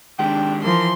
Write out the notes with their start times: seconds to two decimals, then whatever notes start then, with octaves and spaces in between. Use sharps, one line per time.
0.19 D#3 G#3 D4 G4 G5
0.64 E3 F3 A#4 C6